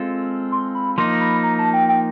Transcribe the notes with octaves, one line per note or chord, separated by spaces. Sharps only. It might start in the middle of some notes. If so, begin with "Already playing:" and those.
Already playing: G#3 C4 F4 A4
C6
B5
F3 A#3 D#4 C6
B5
A#5
A5
G5
G5